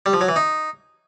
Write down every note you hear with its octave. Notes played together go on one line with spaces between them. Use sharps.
G3
F3
F#3
E3
D#4